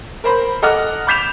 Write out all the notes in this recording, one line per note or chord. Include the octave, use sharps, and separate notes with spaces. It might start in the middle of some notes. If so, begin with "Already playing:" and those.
A#4 C5 B5
A4 D#5 F#5 A#5 D6 F6
B5 D6 G6 B6 E7 F7